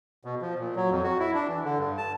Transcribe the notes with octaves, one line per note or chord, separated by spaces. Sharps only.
B2
F3
A#2
F#3
F2
F#4
E4
D4
E3
D3
G2
A5